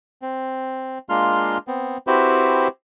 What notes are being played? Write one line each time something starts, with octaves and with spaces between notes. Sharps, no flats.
C4
G#3 A#3 D4 F4 C6 F6
B3 C4
C4 E4 F#4 G4 B4 C5